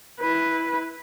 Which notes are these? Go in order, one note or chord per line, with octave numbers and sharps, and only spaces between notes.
E4 B4